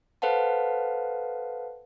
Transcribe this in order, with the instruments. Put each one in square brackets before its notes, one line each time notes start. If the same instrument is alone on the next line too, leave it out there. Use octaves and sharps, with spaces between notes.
[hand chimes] A4 B4 C5 F5 F#5 A5